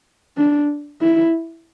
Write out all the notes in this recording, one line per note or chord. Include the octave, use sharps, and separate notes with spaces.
D4
E4